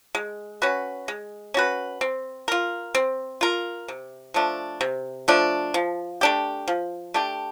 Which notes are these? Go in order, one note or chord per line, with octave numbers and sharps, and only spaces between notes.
G#3
C#4 F#4 B4
G#3
C#4 F#4 B4
C4
F4 A#4
C4
F4 A#4
C3
F3 A3 D4
C3
F3 A3 D4
F3
A3 D4 G4
F3
A3 D4 G4